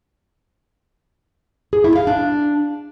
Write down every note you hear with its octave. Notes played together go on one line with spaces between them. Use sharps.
G#4
E4
F5
D4